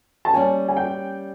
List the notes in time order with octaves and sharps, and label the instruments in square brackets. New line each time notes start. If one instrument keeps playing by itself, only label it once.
[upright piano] A5
[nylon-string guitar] G3 A#3 C#4 [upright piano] G#5
[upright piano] G#5
G5